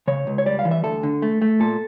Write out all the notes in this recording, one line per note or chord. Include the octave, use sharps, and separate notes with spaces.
C#3 C#5
C#2
C#5
G3 D5
F5
E3
E5
D2 A4
D3
A3
A3
A#2 A4